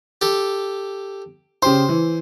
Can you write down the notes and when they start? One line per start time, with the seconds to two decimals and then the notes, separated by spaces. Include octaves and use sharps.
0.21 G4 A4
1.62 C#3 G4 C5 C6
1.89 E3